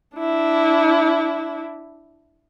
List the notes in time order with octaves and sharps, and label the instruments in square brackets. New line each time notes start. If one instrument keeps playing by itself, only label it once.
[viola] D4 E4